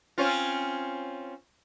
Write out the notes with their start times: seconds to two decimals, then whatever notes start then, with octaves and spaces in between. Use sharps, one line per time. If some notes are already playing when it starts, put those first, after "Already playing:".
0.18 C4 C#4 F4